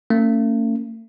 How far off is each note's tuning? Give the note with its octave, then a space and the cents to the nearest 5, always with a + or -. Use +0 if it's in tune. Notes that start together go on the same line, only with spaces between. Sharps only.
A3 +45 C#4 +0